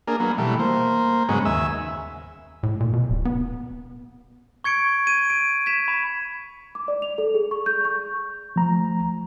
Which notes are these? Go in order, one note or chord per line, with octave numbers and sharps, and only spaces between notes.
A#3 D4 G#4 A#4
F#3 A#3 B3
B2 E3 G3 A3
A#3 C5
G#2 C#3 F#3 G#3 B3 C#4
D#2 E5 G#5 E6
A2
A#2
B2
D1
B3
C#6 G#6 C#7 D7
G#6 D#7
D7
G#6 B6 E7
B5
D6
D5
F7
A4
G#4
C#6
G6
C#6
F3 A3 A#5